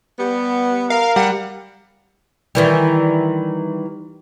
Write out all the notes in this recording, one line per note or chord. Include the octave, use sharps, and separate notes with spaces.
G3 B3
A#4 F5
G3 F#5
D#3 E3 G3